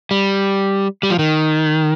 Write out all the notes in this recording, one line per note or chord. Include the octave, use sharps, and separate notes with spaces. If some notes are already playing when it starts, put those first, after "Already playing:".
G3
G3
F3
D#3